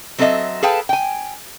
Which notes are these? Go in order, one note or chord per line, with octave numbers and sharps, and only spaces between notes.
F#3 C4 A4 A#4 D#5 E5
G#4 A4 B4 F5 G5 A5
G5 G#5